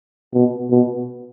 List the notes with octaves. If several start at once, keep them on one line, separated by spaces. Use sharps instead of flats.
B2
B2